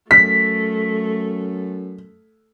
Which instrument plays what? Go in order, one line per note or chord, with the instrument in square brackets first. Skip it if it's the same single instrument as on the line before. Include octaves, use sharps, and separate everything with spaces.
[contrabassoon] F#2 [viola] A3 [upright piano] B6